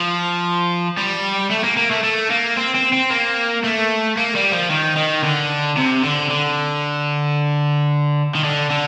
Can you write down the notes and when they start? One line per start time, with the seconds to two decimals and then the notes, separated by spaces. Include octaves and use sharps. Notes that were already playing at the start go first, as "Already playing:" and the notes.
Already playing: F3
0.97 G3
1.50 A3
1.64 A#3
1.77 A#3
1.91 A3
2.03 A3
2.30 A#3
2.57 C4
2.75 C4
2.93 C4
3.10 A#3
3.64 A3
4.17 A#3
4.35 G3
4.52 F3
4.70 D#3
4.97 D#3
5.23 D3
5.77 C3
6.04 D3
6.31 D3
8.35 D#3
8.44 D3
8.70 D3